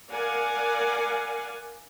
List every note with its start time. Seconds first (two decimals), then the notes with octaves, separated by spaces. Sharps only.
0.11 A#4 D5 F5 F#5 G#5